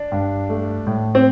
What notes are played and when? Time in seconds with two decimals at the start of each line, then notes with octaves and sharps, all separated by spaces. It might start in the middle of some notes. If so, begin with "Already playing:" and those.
Already playing: D4
0.12 G2
0.49 A3
0.87 A2
1.15 C4